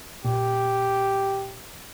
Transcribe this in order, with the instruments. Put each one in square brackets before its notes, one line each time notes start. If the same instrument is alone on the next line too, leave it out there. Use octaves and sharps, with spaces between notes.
[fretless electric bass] A#2 [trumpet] G4